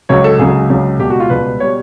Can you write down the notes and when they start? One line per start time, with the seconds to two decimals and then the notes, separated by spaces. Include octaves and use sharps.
0.09 C#2 C#3 F#3 C#5
0.24 A4
0.39 C#2 C#3 F#3 G#4
0.70 C#2 C#3 F#3
0.99 C#2 B2 G3 G4
1.10 F#4
1.20 F4
1.30 C#2 B2 G3 B4
1.60 B2 G3 C#5